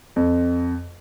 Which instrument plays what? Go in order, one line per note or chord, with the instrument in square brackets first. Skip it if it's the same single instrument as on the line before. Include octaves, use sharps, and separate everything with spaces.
[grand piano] F2